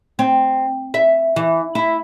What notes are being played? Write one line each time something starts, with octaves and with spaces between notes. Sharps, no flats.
C4
E5
E3
E4